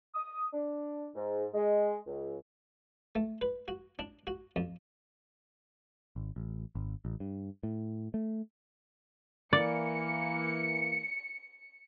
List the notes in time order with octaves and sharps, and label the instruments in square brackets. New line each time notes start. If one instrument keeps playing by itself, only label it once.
[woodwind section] D#6
D4
G#2
G#3
C#2
[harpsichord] A3
B4
F#4
D4
F#4
F2
[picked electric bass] G#1
A1
G#1
A1
G2
A2
A3
[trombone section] E3 A#3 [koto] D5 [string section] C#7